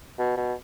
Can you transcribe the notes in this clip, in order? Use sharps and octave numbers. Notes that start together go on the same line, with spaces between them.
B2
B2